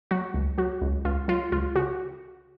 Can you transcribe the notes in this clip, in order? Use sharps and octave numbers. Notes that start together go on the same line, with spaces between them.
F#3 F#4
C#2
F#3 F#4
C#2
C#2 F4
F#3 F4
C#2 F4
C#3 F#4